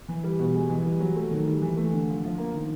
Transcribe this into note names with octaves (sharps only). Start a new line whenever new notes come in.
E3
G3
B2
G#3
E3
G3
F#3
A3
D#3
G3
E3
A3
D3
F3
F3
A#3
D#3